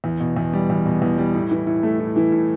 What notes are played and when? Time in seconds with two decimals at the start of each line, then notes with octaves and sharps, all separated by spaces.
0.04 E2
0.20 B2
0.37 E2
0.53 G3
0.70 E2
0.86 B2
1.02 E2
1.18 G3
1.34 A2
1.51 E3
1.67 A2
1.83 A3
2.00 A2
2.16 E3
2.32 A2